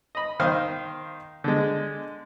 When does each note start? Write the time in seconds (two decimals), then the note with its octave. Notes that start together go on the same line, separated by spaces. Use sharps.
0.15 D#5 B5
0.40 D#3 C5 F5 D#6 F6
1.44 D3 G#3